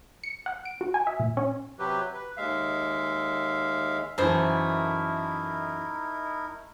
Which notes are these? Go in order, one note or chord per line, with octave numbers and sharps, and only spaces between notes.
C#7
F#5
D7
F#4
G#5
E5
A#2
C#4
C3 F#3 G4 B4
B4
D#2 G#3 E5 F5
F#2 E3 A3 D#4 E4 A#4 C5